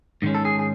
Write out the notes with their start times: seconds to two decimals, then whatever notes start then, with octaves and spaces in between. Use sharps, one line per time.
0.22 G#2 D#3 G#3 C#4
0.35 A4
0.45 G#4
0.59 G#4